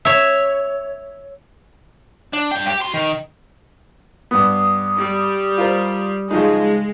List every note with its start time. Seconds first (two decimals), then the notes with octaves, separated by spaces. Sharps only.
0.05 C#5 E5
2.33 D4
2.51 G2 G5
2.67 G4
2.82 F#4 C6
2.94 D#3
4.31 G2 B3 D#6
4.97 G3
5.58 F4 A#4 C5
6.31 C#3 F3 G#3 D#4